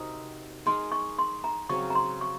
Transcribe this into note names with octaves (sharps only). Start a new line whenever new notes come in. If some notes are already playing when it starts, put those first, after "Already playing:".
Already playing: C3 C4 D#4 F#4 A#4
G#3 D#4 A#4 C6
C#6
C6
A#5
C#3 F#3 C4 C#6
A#5
C6
C#6